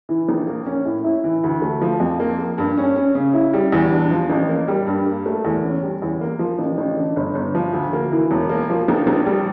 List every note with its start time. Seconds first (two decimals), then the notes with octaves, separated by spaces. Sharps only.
0.09 E3
0.29 A#1
0.47 A#3
0.66 C#4
0.85 A2
1.04 E4
1.24 E3
1.44 D2
1.62 A3
1.81 F3
2.00 F2
2.20 A#3
2.39 A#3
2.58 G2
2.77 C#4
2.96 C#4
3.15 C#3
3.34 E4
3.53 G3
3.72 E2
3.92 D4
4.11 F3
4.29 A1
4.49 A#3
4.68 G3
4.87 G2
5.06 A#3
5.26 A3
5.45 E2
5.64 C#4
5.83 G3
6.02 E2
6.21 A#3
6.39 F3
6.59 A1
6.78 A1
6.97 D3
7.16 G1
7.35 G1
7.55 F3
7.73 D2
7.93 A#3
8.12 E3
8.31 E1
8.49 A#3
8.70 F3
8.88 A#1
9.07 A#1
9.26 G3